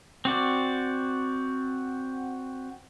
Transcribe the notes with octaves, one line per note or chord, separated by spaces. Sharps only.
C4 F#4 D5